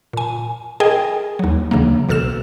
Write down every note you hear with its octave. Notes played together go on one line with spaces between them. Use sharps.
A#2 G#5
G#4 A#4 D#5 G5 G#5
D#2 F#3
D2 C#3 E3 F#3 A#3
B1 B2 A4 F6 E7